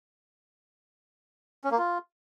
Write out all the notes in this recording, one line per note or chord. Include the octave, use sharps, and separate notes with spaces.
C#4
A#3
F4